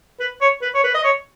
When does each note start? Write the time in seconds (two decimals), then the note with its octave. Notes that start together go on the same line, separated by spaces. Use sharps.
0.20 B4
0.41 C#5
0.62 B4
0.74 C#5
0.84 B4
0.94 D#5
1.04 C#5